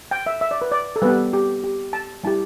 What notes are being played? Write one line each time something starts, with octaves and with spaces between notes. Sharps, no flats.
G5
E5
E5
D5
B4
D5
A4
G3 B3 G4 B4
G4
G4
A5
G3 E4 G4 A5